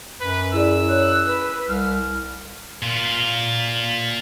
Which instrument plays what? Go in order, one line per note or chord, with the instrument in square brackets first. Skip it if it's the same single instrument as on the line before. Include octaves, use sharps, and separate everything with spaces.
[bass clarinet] F#2 [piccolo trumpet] B4
[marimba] E4 G#4 D5 [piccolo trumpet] E6
[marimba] C#5 [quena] F#6
[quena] B4
[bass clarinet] C2 [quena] F6
[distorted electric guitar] A#2 F4